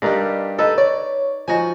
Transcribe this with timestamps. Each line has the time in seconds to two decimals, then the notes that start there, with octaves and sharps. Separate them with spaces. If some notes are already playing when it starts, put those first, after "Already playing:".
0.02 G2 G3 D4 D#4 A#4
0.59 D#4 A4 B4 D#5
0.78 C#5 D5
1.48 F3 D#4 F#4 G#5